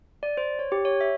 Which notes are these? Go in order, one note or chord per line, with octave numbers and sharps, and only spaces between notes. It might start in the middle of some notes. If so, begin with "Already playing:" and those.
D5
C5
C#5
G4
C#5
E5